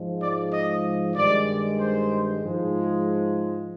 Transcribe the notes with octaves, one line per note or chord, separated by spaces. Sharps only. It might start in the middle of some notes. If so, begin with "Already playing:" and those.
Already playing: G#2 F3 G#3
D5
D#5
G2 D#3 G#3 D5
C5
G#2 F3 G#3